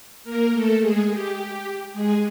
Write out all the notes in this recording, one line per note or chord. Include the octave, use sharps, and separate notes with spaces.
A#3 A#4
A3 A4
G#3 G#4
G4
G#3 G#4